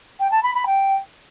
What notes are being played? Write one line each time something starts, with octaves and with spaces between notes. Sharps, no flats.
G5
A5
B5
B5
G5